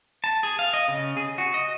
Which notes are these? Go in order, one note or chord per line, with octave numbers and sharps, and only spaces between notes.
A5
G#4
F5
D#5
C#3
G#4
F#4
D#5